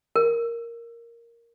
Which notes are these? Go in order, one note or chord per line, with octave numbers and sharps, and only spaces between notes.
A#4